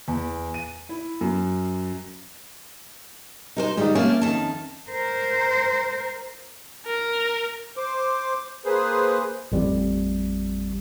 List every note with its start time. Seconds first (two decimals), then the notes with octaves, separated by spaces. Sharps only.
0.08 E2
0.54 D#7
0.89 E4
1.21 F#2
3.56 D#4 A#4 C5
3.77 D#3 G3 G#3 D#4
3.95 F2 A3 A#3 C#4
4.21 F2 D#3 A5
4.90 A#4 C5
6.86 A#4
7.77 C5 D6
8.65 A#3 G#4 B4 C5
9.52 A1 F2 G3